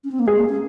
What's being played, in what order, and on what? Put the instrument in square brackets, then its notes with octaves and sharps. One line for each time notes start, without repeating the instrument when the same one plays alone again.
[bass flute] C#4
C4
A#3
[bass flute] G#3 [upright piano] G#4
[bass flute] A#3
C#4